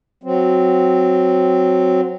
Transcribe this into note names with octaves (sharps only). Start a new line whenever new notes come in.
F#3 C4